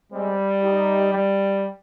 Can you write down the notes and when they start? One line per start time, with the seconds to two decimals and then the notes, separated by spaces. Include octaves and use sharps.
0.12 G3 G#3 C4
0.63 D#4 G4
1.13 G3